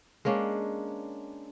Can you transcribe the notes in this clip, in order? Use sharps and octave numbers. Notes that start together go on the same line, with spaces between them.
G#3 A#3 C#4 D4